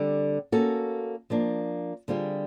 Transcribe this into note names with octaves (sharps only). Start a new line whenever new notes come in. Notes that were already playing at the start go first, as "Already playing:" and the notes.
Already playing: D3 G3 C4
A#3 C#4 F#4 A4
F3 A#3 D4
D3 G3 C4 F4 G#4